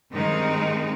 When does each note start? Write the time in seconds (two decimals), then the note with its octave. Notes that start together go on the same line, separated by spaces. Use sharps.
0.12 G2 D#3 G#3 C4 D#4